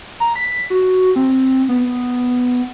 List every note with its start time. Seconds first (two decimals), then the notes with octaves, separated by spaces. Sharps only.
0.20 A#5
0.36 B6
0.70 F#4
1.16 C4
1.69 B3